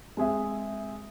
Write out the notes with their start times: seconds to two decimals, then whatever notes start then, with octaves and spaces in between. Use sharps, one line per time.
0.17 G#3 C4 G#4 E5